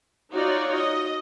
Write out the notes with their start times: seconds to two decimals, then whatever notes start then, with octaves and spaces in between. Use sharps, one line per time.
0.31 D#4 F4 F#4 C#5 D5
0.74 D#5